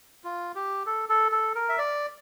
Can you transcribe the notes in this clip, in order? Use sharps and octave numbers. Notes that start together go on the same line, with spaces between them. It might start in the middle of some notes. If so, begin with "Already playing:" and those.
F4
G4
A4
A4
A4
A#4
E5
D5